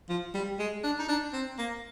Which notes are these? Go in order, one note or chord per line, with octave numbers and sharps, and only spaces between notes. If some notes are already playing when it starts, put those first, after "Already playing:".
F3
G3
G#3
D4
D#4
D4
C4
A#3